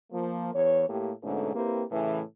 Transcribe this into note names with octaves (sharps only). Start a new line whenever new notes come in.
F3 A#3
E2 E3 C#5
A2 A#3 G4
G#2 B2 D3 A3 C#4
A#3 C4 E4 G4 B4
A2 C#3 E3